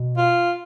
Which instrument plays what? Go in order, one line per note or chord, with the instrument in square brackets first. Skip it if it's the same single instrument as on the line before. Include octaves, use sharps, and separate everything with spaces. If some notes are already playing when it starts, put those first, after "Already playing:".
Already playing: [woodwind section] B2
[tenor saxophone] F4